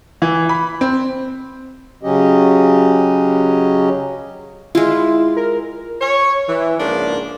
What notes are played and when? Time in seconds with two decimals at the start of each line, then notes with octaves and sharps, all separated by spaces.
0.22 E3
0.49 B5
0.81 C4
2.03 C#3 F#3 C#4 G4 D#5
4.75 G#3 E4 F4
5.37 A#4
6.01 C#5
6.49 E3
6.79 G#2 C#3 F3 A#3 D4